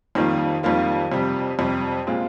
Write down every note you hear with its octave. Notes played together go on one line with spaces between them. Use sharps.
F2 D#3 G3 A#3 F4
F2 D#3 G3 A#3 F4
F2 C3 G3
F2 C3 G3
A#2 G#3 C4 F4